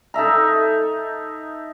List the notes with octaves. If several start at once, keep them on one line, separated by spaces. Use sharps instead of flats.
D#4 A4 E5 A#5